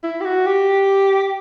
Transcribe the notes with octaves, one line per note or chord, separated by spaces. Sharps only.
E4
G4
F#4
G4